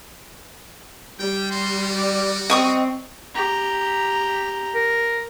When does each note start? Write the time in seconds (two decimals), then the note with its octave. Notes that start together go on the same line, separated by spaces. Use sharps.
1.19 G3 G5
1.51 F#4 C6
1.93 D5
2.50 C4 D#5 C#6 D#6
3.35 G4 A#5
4.75 A#4